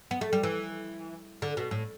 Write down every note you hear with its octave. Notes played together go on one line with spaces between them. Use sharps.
B3
A3
G3
E3
D3
B2
A2